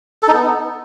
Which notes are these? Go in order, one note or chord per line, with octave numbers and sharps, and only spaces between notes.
A4
D#4
B3